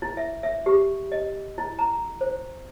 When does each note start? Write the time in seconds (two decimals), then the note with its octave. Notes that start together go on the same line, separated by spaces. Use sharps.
0.02 E4
0.17 E5
0.43 E5
0.66 G4
1.12 D#5
1.58 E4
1.79 A#5
2.21 C5